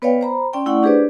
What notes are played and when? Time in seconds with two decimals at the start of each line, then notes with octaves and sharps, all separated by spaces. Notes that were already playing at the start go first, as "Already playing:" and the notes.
0.02 B3 B4 C#5 D5 F5 G5
0.21 C5 A#5 B5
0.53 C#4 D5 G5 C6
0.66 A3 E4 D5 F#5 C#6
0.83 D4 G4 G#4 B4 C5 D5